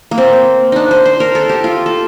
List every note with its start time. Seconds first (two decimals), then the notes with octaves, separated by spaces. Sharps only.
0.11 A#3
0.18 C4
0.72 D4 D#4
0.91 C5
1.06 C5
1.20 A#4
1.35 A4
1.49 G4
1.64 F4
1.86 A4